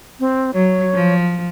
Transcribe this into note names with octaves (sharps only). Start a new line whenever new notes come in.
C4
F#3 C#5
F3